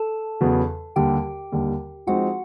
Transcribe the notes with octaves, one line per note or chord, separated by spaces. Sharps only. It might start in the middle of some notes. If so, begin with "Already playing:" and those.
Already playing: A4 A5
E2 C#3 F#3 B3
D#2 D3 G3 G4 G5
D#2 D3 G3
F3 G#3 C4 D#4 F#4 F#5